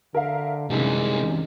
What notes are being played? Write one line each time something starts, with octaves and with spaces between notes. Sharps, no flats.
D3 A#4 E5 F5
C2 F#2 C3 D#3 E3 G#3